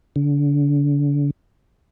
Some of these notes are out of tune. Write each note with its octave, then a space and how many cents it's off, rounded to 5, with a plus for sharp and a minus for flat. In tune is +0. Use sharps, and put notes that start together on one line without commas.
D3 -35